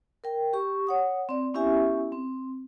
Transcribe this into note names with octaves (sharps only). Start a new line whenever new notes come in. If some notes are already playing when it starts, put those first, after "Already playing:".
A#4 G5
G4 C#6
C#5 F#5 D#6
C4 D5
B3 C#4 E4 G4 E5 G#5
C4